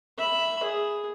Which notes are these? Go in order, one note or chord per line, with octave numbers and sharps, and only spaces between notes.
E5 B5
G#4